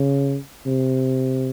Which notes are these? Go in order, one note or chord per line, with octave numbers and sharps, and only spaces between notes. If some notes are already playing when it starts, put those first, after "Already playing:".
Already playing: C#3
C3